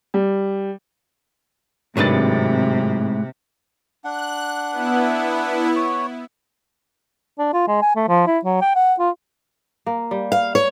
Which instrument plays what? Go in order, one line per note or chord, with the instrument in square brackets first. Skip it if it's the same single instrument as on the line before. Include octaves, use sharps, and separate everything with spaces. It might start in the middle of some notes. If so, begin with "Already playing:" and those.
[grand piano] G3
[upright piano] G#1 A6 [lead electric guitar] A2 G#3 [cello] C3 [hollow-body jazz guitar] F#3 D4 B4
[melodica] D4 F#5 [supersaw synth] F#6
[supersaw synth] B3 E4
[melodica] C#5
[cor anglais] D4
F4
G#3
G#5
A3
F3
E4
F#3
G5
F#5
F4
[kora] A#3
G3
[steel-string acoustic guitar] F5
C#5